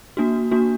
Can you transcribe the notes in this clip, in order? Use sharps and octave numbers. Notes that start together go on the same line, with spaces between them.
A#3 D4 F#4
A#3 D4 F#4